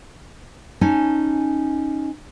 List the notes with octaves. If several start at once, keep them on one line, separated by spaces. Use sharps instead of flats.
C#4 D#4 G#5 A5